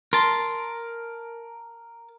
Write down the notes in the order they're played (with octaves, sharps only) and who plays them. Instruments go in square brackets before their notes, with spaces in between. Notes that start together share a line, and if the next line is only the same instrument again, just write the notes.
[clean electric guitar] A#4 A5 [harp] C6